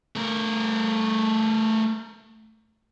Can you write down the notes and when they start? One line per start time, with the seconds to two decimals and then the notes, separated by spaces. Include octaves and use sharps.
0.16 A3 A#4